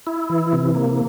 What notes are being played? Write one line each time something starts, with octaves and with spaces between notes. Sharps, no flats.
E4
E3
C3
A#3